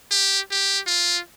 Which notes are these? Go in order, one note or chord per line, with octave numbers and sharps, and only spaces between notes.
G4
G4
F4